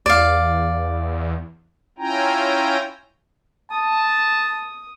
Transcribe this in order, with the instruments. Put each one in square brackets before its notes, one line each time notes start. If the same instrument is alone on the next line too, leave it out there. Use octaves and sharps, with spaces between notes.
[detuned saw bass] E2 [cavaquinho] D5 F5
[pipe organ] C#4 E4 F4 G5 G#5 A#5
[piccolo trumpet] A5 [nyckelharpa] D#6